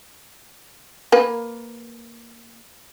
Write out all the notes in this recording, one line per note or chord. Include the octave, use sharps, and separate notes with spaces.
A#3 B4